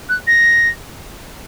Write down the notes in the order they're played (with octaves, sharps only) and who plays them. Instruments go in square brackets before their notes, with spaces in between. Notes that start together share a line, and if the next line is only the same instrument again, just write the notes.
[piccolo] F#6
A#6